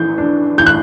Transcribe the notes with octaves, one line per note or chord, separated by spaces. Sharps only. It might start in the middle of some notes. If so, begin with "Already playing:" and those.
Already playing: E3 G6
D4
E3 G6
F#6